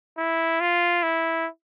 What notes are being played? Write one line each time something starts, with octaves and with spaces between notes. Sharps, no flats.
E4
F4
E4